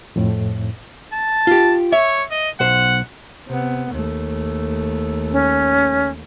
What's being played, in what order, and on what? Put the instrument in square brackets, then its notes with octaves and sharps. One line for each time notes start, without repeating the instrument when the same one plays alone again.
[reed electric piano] F2 A2
[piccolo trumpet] A5
[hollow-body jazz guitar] F4 G4
[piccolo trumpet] C#5 [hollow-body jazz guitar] E5
[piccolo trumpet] D#5
[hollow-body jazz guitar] B1 C5 [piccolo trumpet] F#5
[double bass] C3 B3
D#2 A3
[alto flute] C#4